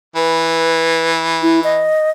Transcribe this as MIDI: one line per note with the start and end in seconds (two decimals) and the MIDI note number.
0.16 1.89 52
0.16 1.10 71
1.42 1.60 64
1.64 2.10 75